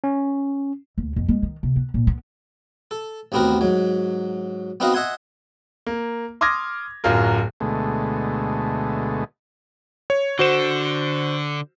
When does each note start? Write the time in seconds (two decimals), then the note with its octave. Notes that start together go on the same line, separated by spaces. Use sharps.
0.04 C#4
0.98 D2
1.16 F2
1.28 G#3
1.42 D#3
1.63 C3
1.76 B3
1.94 A#2
2.07 B3
2.91 A4
3.32 A1 D#2 B3 C4 F#4 A#4
3.61 G#2 F#3
4.80 B3 C4 D#4 F#4 D#5 F5
4.94 D#5 E5 F#5 G#5 C6
5.87 A#3
6.41 C6 D6 D#6 F6 G#6 A#6
7.04 D1 F#2 F#3 F4 A#4
7.61 D2 B2 G#3 A3
10.10 C#5
10.39 D3 F#4 C5 E7